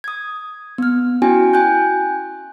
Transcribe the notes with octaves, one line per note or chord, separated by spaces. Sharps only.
D#6 G#6
B3 F6
C#4 E4 F#4 G5 G#5
G5 G#5 F#6 G6